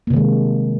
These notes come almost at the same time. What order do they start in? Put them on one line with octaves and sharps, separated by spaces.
A#3 C3 D#3 G#3